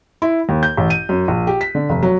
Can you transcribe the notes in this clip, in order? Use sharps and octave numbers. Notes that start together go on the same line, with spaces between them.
E4
D#2
G6
A1
D#7
F#2
A#1
G4
B6
D3
F1
F#3